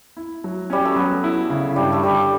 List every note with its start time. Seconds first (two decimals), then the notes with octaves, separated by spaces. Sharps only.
0.17 E4
0.44 F#3
0.70 G3 C#4
0.85 A3
0.96 F#3 B3
1.24 E4
1.50 C#3
1.76 G2 G3
1.93 A3
2.03 D3 G3